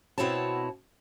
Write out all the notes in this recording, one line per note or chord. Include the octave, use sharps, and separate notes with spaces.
B2 C4 E4 F#4 C#5 A5